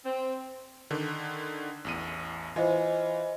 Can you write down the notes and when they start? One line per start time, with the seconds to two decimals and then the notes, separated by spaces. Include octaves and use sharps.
0.04 C4
0.91 D3 D#3 D4
1.85 A1 E2 D#7
2.56 E3 F4 C5 D#5 G#5